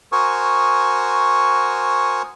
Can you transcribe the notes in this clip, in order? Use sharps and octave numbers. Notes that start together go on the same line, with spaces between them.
F#4 A#4 C5 G#5 C#6 D#6